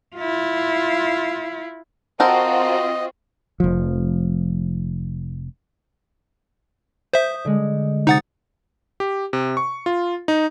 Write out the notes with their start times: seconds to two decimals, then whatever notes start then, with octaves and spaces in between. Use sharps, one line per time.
0.16 E4 F4
2.20 C4 F4 F#4 A4 A#4 C5 D#5 F#5
3.60 F1 F3
7.13 C5 E5 D#6 G6
7.45 D3 G#3
8.07 C3 D#4 F#5 D#6 A6
9.00 G4
9.33 C3
9.57 C#6
9.86 F4
10.28 D#4